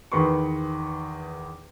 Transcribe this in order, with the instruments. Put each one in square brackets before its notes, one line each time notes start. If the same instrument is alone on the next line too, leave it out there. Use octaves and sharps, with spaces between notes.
[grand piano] E2 D#3 B4 C6 C#6